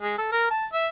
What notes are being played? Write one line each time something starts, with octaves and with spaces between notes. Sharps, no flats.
G#3
A4
A#4
A5
E5